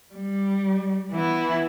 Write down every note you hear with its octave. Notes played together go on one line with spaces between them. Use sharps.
G3
E3 B3 E4